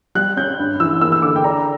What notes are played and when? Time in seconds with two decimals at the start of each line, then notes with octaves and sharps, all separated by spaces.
0.15 G3 F#6
0.37 C#4 G6
0.59 G2
0.80 E3 E6
1.01 A#3 E6
1.12 E6
1.22 D3 D6
1.36 G5
1.44 D4 A#5